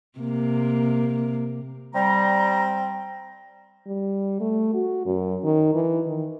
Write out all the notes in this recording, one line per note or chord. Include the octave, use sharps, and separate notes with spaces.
C3 A#3
G3 C4 A#5
G3
A3
F#4
F#2
D#3
E3
D#3